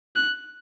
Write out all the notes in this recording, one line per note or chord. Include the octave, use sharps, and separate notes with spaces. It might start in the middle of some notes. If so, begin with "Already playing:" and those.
F#6